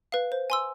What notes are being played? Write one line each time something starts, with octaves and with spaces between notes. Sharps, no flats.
B4 F5
C5
G#5 C6 E6